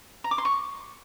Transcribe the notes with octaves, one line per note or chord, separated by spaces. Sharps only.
A#5
D6
C6
C#6